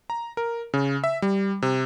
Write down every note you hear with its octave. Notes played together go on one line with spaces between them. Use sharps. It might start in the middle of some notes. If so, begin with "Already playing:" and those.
A#5
A#4
C#3
E5
G3
C3